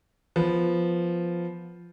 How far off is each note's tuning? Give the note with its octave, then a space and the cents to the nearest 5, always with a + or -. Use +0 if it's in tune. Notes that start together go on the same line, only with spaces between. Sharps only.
F3 -5 B3 +0